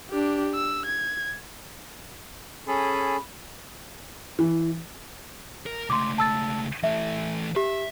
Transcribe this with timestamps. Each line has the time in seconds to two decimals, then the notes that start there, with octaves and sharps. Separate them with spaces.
0.10 D4 G4
0.55 E6
0.86 G#6
2.68 C#4 G#4 A4 B5
4.39 E3
5.66 A#4
5.90 C#2 A3 C6 D6
6.18 A5 E6 A6
6.84 E3 A3 E5
7.56 G4 E5